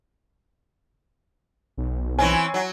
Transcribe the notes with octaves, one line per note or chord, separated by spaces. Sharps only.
B1
E3 C4 C#4 G#5
F#3